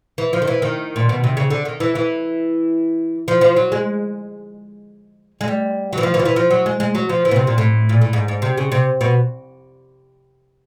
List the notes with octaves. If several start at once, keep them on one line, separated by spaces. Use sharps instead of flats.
E3
F3
D#3
E3
D#3
A#2
B2
C3
C#3
D3
D#3
E3
E3
F3
F3
F#3
G#3
G#3
G3
F#3
E3
F3
E3
F3
E3
F3
F#3
G#3
G#3
F#3
F3
E3
B2
C3
A#2
A2
A#2
A2
G#2
G#2
C3
C#3
C3
B2